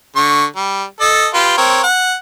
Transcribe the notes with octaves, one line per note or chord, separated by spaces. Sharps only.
D3 C#6
G3
A4 D#5
F4 G4 B4
C4 A#4 C#5
F#5